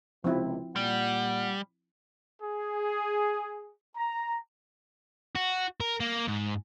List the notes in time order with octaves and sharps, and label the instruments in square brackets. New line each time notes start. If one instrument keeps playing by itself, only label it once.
[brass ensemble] C#2 C3 [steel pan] F3 C4 E4
[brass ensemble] A#2 F#5 [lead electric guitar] G3
[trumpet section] G#4
A#5
[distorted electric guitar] F#4
A#4
A#3
G#2